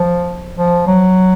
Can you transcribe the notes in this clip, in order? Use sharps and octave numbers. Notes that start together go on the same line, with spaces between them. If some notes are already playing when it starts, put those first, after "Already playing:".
Already playing: F3
F3
F#3